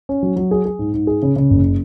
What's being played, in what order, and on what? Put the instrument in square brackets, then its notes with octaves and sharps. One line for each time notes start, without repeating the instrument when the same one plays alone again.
[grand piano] C#4
F#3
F#3
G#4
G#4
G#2
G#2
G#4
C#3
C#3
F#1